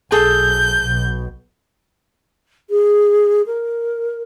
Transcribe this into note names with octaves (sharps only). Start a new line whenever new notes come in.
B1 G#4 A4 G6
B1 B2
G#4
A#4